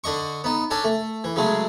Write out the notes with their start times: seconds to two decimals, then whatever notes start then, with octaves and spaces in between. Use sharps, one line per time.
0.04 D3 D4 D#5 C#6
0.44 B3 D#4
0.71 C#4 D4 A4 D5
0.84 A3
1.24 E3
1.36 C#3 F#3 G#3 A3